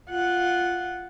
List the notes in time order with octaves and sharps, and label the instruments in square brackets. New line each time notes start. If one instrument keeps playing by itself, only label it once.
[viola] F4 F#5